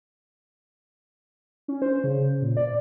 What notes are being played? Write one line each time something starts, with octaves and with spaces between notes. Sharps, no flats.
C#4
C5
C#3
A#2
D5